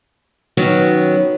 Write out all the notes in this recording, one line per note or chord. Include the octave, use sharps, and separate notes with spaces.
D#3 F#3 B3 C#4